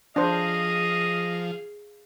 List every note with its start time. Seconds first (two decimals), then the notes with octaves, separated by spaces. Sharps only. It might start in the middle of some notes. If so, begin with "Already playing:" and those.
0.16 F3 D4 G#4 C5 D#5 F5